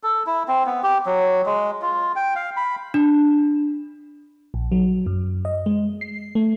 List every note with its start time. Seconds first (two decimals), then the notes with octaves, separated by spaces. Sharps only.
0.03 A4
0.27 E4
0.48 C4
0.66 B3
0.83 G4
1.06 F#3
1.46 G#3
1.82 F4
2.16 G5
2.36 F5
2.57 B5
2.94 D4
4.54 A#1
4.72 F#3
5.06 F#2
5.45 D#5
5.66 G#3
6.01 C7
6.35 A3